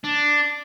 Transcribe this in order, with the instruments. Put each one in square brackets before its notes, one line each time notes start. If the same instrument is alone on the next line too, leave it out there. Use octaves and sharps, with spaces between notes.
[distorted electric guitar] D4